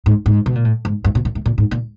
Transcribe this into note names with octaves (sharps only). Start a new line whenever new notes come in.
G#2
G#2
B2
A#2
A2
G#2
G2
B2
A#2
A2
A#2
G#2
A#2